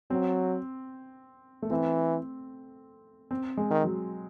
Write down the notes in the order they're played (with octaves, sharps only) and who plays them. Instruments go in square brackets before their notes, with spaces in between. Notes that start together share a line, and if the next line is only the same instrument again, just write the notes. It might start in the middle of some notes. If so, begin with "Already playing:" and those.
[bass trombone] F#3 [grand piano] C4
[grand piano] A3
[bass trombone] E3 [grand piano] C4
[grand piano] C4
G#3
[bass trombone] D#3
[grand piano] F#3